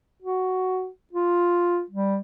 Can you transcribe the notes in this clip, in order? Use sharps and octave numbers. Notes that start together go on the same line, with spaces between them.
F#4
F4
G3